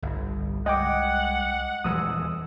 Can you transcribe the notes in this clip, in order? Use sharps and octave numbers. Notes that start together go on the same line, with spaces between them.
G1 C2
G#3 D#5 F#5 G5 D6
D#1 E2 E3 G#3 D#6 E6